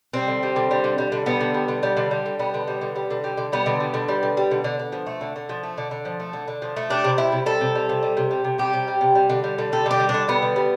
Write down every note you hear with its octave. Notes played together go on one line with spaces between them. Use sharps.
G3 C4
D3
G3
D3
G3
D3
G3
D3
G3 B3
D3
G3
D3
G3
D3
G3
D3
G3 B3
D3
G3
D3
G3
D3
G3
D3
G3 B3
D3
G3
D3
G3
D3
G3
D3
D3
D3
F3
A3
D3
D3
F3
A3
D3
D3
F3
A3
D3
D3
F3
A3
G3 D4
C3
G3 E4
C3
G3 A4
C3
G3
C3
G3
C3
G3
C3
G3 G4
C3
G3
C3
G3
D3
G3
D3
G3 A4
D3 G4
G3
D4
D3
G3 B3
D3
G3